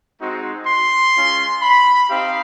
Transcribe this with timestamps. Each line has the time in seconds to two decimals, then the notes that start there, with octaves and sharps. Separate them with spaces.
0.19 G#3 C4 D#4 F#4
0.67 C6
1.15 G#3 C#4 F4
1.62 B5
2.09 C4 D#4 G4 F5